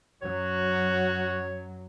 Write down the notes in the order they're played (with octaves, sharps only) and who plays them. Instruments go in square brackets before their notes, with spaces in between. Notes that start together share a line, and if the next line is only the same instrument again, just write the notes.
[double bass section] F#2 F#3 [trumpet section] F#4 [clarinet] C#5